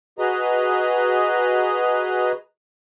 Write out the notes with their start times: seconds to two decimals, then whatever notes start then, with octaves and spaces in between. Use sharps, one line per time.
0.19 F#4 G#4 B4 D#5 A#5